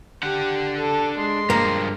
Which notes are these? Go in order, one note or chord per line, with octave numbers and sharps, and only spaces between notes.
D4 G4 F#5
A4
G#3 C6
G2 F3 A#3